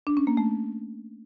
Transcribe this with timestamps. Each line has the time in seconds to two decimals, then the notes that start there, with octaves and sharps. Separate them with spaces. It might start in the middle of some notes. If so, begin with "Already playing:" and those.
0.07 D4
0.17 C#4
0.27 A#3
0.37 A3